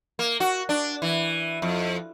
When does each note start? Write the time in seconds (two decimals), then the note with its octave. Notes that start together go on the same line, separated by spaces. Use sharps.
0.19 A#3
0.40 F#4
0.69 D4
1.02 E3
1.62 F2